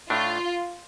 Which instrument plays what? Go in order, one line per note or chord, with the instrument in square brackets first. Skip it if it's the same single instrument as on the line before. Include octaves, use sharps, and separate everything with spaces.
[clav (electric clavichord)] A2 A3 D4 [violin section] F4